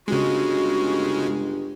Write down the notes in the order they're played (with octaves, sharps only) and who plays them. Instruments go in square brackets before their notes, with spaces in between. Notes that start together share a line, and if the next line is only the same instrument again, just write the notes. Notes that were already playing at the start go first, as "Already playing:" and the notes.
[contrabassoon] G1 [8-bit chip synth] C#3 G#3 [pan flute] F#4